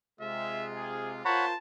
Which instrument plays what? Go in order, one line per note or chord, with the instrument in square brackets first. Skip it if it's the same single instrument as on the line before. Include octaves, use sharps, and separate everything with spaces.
[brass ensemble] C3 G#3 F4 [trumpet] E5
[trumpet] G#4
[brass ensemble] F4 A#4 C5 [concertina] C#5 F#5 B5 [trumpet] A5